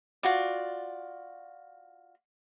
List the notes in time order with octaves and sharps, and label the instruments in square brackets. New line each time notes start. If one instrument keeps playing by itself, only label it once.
[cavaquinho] F4 F#4 D5